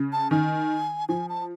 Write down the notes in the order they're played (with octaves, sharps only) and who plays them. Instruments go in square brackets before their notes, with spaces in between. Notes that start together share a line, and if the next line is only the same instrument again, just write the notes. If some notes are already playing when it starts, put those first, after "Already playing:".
Already playing: [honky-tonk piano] C#3
[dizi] A5
[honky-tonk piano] D#3 [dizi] G#5
[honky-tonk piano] F3 [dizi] G#5
[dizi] A5